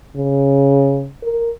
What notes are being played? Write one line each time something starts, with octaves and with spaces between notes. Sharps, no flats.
C#3
A#4